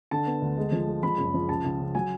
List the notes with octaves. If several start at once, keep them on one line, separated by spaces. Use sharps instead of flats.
D3 A5
B3
D2
G#3
F3
G#3
F3 B5
F#1
F3
C#2 A5
C#2
C#3
F#3 G#5